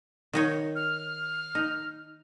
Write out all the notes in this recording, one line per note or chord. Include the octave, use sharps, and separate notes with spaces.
D#3 D#4 C#5
F6
D#4